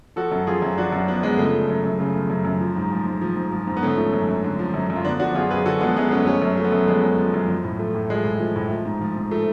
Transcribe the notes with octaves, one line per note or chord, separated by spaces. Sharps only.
F3 F#4 A4
F#2
F3 F4 G#4
F#2
F3 D4 F#4
F#2
F3 B3 D4
F#2 G#3 B3
C#3 A3
F3
F#2
F#2
C#3 A3
F3
F#2
F#2
F3
G#2
F3
G#2
F3
G#2
F3
G#2
B3
D3 A3 C#4
F3
F#2
F#2
D3
F3
F#2
F#2
F4
D3 B3 D4
F3 D4 F#4
F#2 F4 G#4
F#2 G#4 B4
D3 F#4 A4
F3 G#3 B3
F#2 G#3 B3
F#2 A3 C#4
F3 A3 C#4
F#2
F3 A3
B3
F#2 A3
F3 G#3 B3
F#2
F3
F#2
F3
A2
F3 A3
A2
F3 G#3
A2
F3
A2
F3
G#2
F3
G#2
F3 A3